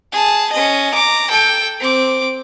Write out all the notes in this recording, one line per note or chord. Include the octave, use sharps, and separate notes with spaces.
G#4 A5
C#4 D#5
A#5 D6
A4 G5
C4 D6